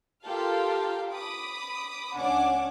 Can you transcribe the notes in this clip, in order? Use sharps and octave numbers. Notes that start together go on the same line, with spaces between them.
F4 G4 A4 A#4 F5 G5
B5 D6 D#6
C#2 C#4 D4 F#5 G#5 D6